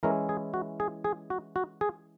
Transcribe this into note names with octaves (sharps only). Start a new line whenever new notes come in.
E3 G#3 C#4 E4 A#4
G#4
F#4
G#4
G#4
F#4
F#4
G#4